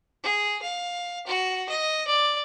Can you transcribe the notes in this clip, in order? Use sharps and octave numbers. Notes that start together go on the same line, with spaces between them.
G#4
F5
F#4
D#5
D5